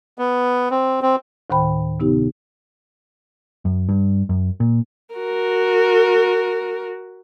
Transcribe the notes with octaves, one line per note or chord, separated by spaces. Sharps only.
B3
C4
C4
D2 A2 D#3 C5 G5 B5
C3 B3 D#4 G4
F#2
G2
F#2
A#2
F#4 A#4